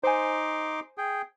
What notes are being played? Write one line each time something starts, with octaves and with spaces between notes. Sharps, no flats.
D#4 C5 G#5 C6 D6
G#4 G5